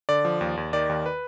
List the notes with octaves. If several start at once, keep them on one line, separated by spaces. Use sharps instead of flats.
D3 D5
F3
D#2
D#2
D#3 D5
D#2
B4